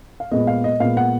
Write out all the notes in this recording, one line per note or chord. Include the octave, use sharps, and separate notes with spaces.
F5
A#2 G#3 B3 D#5
F5
D#5
A#2 G#3 B3 F5
F#5